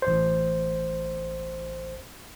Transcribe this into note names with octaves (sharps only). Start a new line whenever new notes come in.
A1 C5